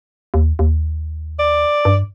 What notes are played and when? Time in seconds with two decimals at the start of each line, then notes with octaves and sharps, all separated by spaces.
0.34 D#2
0.59 D#2
1.39 D5
1.85 G2